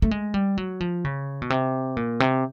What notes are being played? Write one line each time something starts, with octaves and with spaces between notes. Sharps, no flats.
A3
G#3
G3
F#3
F3
C#3
B2
C3
A#2
C3